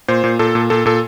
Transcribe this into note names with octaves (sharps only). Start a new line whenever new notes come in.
A#2 C5
A#2
A#2 A4
A#2
A#2 A4
A#2 A4